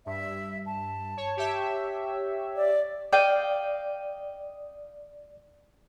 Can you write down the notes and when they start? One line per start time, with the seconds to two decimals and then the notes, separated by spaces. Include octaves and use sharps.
0.06 G2 E5
0.66 A5
1.17 C#5
1.37 G4 C#5 E5
2.56 D5
3.13 D5 D#5 F5 G5